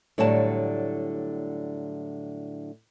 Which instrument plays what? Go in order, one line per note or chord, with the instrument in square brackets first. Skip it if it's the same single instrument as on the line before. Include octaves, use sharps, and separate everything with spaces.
[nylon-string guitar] A2 D3 F#3 G3 A5